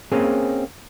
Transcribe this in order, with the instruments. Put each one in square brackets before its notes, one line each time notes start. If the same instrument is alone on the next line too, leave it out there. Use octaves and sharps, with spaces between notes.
[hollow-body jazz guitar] A#3 C4 C#4 G#4